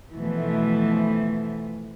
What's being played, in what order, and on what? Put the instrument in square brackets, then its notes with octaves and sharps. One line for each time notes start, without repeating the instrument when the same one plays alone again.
[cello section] B2 E3 F3 A3